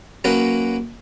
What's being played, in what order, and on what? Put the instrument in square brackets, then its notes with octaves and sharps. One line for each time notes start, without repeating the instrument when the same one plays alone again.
[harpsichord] F#3 A#3 C#4 A#4 B4